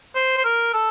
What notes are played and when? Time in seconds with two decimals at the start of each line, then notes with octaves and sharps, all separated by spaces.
0.15 C5
0.37 C5
0.44 A#4
0.74 A4